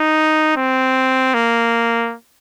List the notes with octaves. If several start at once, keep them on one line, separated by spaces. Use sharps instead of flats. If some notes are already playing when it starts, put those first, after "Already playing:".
Already playing: D#4
C4
A#3